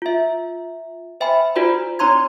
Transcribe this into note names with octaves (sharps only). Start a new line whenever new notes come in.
F4 E5
C5 E5 G5 G#5 B5
D#4 F4 F#4 C5 D5 B5
C4 D#4 C#5 A#5 C6 G#6